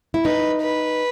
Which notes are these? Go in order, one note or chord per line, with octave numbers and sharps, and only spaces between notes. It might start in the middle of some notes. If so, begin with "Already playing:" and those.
E4
D#4 B4
B4